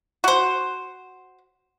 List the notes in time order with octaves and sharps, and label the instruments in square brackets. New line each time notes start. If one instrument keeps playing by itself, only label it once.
[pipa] F#4 C5